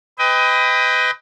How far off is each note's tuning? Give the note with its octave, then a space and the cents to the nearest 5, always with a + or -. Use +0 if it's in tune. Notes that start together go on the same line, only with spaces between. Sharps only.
B4 +30 D#5 +20 G5 +25